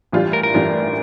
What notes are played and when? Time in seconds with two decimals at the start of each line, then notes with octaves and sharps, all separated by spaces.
0.12 A2 E3 G3 D4 F4
0.33 A#4
0.43 A#4
0.54 A2 E3 G3 D4 F4